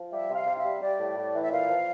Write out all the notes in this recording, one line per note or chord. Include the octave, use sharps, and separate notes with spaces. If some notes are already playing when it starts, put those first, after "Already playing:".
Already playing: F3
G3 E5
C3
F5
C3
E5
G3
G3 D5
A2
A2
E3
E5
A#2 F5
F3